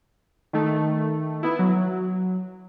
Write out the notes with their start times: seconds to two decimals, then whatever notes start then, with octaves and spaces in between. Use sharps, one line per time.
0.53 D#3 A3
1.43 B3 E4
1.59 F#3